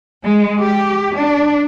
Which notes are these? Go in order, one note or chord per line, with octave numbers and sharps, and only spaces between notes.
G#3
G4
D4